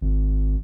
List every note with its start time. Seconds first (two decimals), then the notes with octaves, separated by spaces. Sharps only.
0.01 G#1